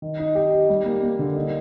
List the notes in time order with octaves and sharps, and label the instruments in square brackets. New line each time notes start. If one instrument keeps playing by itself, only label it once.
[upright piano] D#3
D#4
G4
D#4
G3
A#3
A#3
D3
D#4